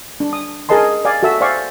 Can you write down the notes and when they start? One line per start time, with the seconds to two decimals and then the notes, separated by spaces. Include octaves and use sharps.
0.20 D4
0.33 D#6
0.69 G#4 A#4 D#5 A5 C6
1.05 D5 F5 G#5
1.23 F#4 A4 E5 E6
1.41 C5 D5 F5 G#5 C#6